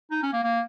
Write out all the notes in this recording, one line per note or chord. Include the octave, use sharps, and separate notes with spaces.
D#4
C#4
A#3
A#3